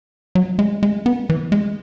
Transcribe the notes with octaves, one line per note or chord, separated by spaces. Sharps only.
F#3
G#3
G#3
B3
E3
G#3